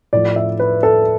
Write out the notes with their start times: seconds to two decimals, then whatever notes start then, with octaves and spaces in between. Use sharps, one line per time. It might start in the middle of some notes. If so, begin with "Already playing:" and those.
0.13 A2 F3 D5
0.36 E5
0.59 B4
0.83 A4